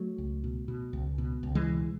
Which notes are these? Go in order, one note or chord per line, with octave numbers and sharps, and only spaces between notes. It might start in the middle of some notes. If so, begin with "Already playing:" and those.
Already playing: F#3 A3
C#2
B2
B2
C#2
B2
C#2
E3 G#3
B2